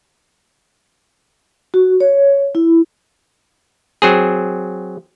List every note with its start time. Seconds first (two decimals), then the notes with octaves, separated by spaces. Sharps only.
1.74 F#4
2.00 C#5
2.55 E4
4.02 F#3 C4 G#4